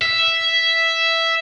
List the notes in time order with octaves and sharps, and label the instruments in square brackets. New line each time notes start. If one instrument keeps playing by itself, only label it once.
[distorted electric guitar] E5